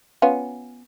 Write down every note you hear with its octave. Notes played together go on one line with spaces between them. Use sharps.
B3 C#4 F4